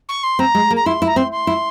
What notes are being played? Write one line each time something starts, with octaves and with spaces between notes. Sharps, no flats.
C#6
C6
C4 A#5
G#3
A#3
A#5
E4 C6
E4
A#5
C4 C6
C6
E4